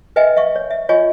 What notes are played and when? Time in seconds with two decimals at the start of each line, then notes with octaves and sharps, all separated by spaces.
0.16 B4 D#5 E5 G5 G#5
0.37 E5 F5 C#6
0.56 C#5
0.71 E5
0.89 F4 C#5 D#5 G#5 C#6